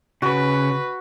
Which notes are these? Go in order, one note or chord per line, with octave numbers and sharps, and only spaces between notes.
C#3 F#4 B4